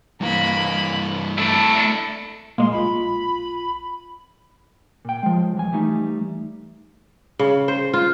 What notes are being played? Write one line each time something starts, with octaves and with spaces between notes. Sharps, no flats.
G2 E3 A#3 B5
A3 D4 E4 A4
A#2 G#3 A#3 C6
B1 F4 B5
A#2 G5
F3 G#3
E2 G#5
E3 G3 A3 D#4
C#3
C5
F4